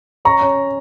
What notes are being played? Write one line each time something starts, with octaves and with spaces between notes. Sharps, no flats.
C#4 A#5 C#6
C#4